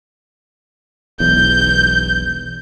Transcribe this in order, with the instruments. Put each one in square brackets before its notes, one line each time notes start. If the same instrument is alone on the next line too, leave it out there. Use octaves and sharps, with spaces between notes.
[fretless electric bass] E1 B1 E2 [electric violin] G6